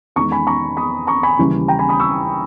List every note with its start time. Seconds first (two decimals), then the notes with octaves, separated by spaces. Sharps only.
0.16 E2 D#3 G#3 A#5 C#6
0.31 G#5 B5
0.47 A#5 C#6
0.77 B5 D#6
1.07 A#5 C#6
1.23 G#5 B5
1.39 D#2 C#3 E3 G3
1.68 G5 A#5
1.79 G#5 B5
1.89 B5 D#6
2.00 C#6 E6